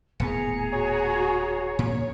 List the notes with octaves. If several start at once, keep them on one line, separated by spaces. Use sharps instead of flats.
D#1 A2 B3 G#4 A#5 C#7
F#4 C#5
A#2